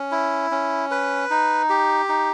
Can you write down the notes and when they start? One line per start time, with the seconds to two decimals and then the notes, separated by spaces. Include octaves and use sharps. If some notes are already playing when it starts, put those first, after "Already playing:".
Already playing: C#4
0.11 E4
0.51 C#4
0.91 B4
1.30 D#4
1.69 G4
2.09 D#4